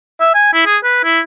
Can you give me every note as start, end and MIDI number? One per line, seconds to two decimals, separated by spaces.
0.21 0.33 76
0.35 0.50 80
0.53 0.64 64
0.66 0.77 68
0.84 1.03 71
1.04 1.20 64